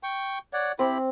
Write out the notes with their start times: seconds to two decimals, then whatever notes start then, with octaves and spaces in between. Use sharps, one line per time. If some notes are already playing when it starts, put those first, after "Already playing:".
0.03 G5 C#6
0.53 C#5 D5 F#5
0.79 C4 E4 G4 B5